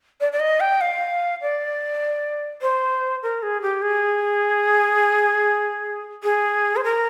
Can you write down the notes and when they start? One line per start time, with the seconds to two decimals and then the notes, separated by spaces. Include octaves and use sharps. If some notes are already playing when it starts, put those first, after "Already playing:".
0.21 D5
0.32 D5
0.40 D#5
0.60 G5
0.81 F5
1.42 D5
2.62 C5
3.23 A#4
3.43 G#4
3.62 G4
3.82 G#4
6.24 G#4
6.76 C5
6.84 A#4